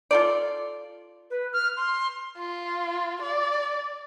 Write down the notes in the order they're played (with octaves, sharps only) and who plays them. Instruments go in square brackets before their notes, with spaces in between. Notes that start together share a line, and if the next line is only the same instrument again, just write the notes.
[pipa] F4 A4 D5
[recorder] B4
F6
C6
[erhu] F4
D5